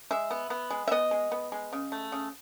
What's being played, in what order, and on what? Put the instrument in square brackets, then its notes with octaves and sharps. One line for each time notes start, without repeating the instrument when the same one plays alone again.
[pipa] G#3 E5
B3
B3
G#3
E5
B3 D#5
G#3
B3
G#3
C#3
A3
C#3